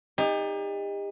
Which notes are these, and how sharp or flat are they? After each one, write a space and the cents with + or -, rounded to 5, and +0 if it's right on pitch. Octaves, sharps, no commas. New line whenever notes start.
D#4 +0 G4 +40 D5 +0